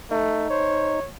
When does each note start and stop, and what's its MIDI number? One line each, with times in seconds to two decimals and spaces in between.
0.11 0.48 57
0.11 1.00 63
0.50 0.96 72
0.50 1.07 73